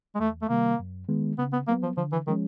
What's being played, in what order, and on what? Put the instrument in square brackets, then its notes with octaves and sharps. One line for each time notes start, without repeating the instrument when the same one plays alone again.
[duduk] G#3
[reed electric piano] E2 [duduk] A3
[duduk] A3
[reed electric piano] C3 D#3 G3 [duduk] A#3
[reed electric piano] F#2
D#3 G#3 B3
[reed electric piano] C#3 [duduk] B3
[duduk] B3
[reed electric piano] F#3 B3 [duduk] A#3
[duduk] F3
[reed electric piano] D3 [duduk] F3
[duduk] E3
[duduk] D#3 [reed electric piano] F3 G#3 C#4